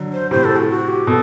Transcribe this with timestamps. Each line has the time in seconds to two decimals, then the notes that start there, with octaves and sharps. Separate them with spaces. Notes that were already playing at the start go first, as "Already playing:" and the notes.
Already playing: D3 F#3
0.13 C5
0.31 A2 C3 C5
0.44 A4
0.56 F#4
0.70 F#4
0.88 G4
1.07 B2 A4